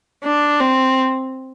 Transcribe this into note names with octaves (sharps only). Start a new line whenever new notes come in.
D4
C4